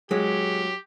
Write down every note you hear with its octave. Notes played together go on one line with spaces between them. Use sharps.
F#3 G#3 G4